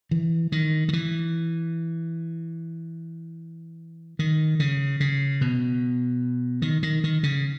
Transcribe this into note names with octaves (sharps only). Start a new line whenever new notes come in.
E3
D#3
D#3
E3
D#3
C#3
C#3
B2
D#3
D#3
D#3
C#3